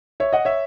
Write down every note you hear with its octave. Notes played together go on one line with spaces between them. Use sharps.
C#5 E5
D#5 F#5
C#5 E5